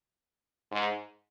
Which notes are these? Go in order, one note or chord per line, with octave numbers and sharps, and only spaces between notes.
G#2